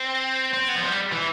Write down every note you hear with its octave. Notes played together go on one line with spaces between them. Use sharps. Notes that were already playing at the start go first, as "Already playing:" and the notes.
Already playing: C4
C4
B3
F3
G3
E3